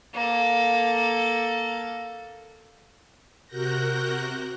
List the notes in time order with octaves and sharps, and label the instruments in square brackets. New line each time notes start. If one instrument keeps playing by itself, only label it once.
[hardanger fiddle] A#3 A4
[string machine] C3 F#4 A#4 F#6 G6 A#6